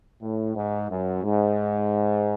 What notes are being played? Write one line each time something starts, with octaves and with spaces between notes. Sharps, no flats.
A2
G#2
F#2
G#2